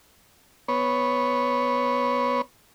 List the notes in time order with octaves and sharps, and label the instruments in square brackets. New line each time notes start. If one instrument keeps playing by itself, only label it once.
[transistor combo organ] B3 C#5